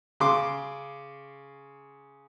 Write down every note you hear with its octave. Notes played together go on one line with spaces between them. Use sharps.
C#3 C6 D6